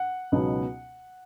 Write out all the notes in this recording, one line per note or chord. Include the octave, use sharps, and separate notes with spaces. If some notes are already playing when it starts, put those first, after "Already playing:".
Already playing: F#5
C#2 B2 F#3 B3 D#4